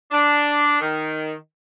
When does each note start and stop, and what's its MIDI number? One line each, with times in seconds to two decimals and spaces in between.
0.12 0.81 62
0.81 1.33 51